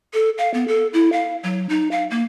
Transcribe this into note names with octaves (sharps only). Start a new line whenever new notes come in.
A4
F5
B3
A4
E4
F5
F#3
D#4
F5
A#3